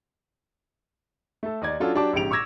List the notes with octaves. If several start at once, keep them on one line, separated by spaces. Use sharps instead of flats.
A3 A4
D#2 D#4 D5 G#6
F#3 C#4 D4 F4 F#4 A4
F#3 D4 G4 A5 D6
A#1 G#2 C#3 G4 D7 F7
C#6 D6 E6 G#6 A#6 E7